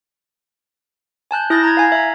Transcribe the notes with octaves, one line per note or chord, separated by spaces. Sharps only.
G#5 A5 F#6 G6
E4 D#6 F#6 G6 A6 A#6
A#5 G#6
F5 G#5
E5 A#5